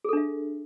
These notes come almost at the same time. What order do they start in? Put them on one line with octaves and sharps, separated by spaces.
G#4 A4 D4 E5